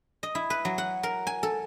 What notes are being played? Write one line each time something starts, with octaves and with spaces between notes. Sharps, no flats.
D#5
E4
B4
F#3
F#5
A#4
G#5
A4